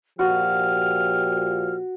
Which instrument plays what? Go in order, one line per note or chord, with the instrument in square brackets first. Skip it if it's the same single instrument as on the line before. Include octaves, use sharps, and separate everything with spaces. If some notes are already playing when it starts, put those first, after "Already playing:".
[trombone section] A#2 F3 G4 [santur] F#4 [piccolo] F6